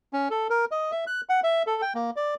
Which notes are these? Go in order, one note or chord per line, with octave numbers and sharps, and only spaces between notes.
C#4
A4
A#4
D#5
E5
F#6
F#5
E5
A4
G5
A#3
D5